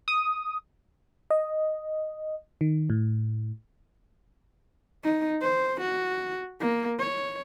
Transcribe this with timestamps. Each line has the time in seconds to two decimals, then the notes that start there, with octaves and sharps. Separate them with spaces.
0.08 D#6
1.30 D#5
2.61 D#3
2.90 A2
5.04 D#4
5.42 C5
5.81 F#4
6.60 A#3
6.99 C#5